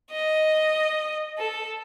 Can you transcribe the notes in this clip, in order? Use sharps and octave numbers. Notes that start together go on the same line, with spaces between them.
D#5
A4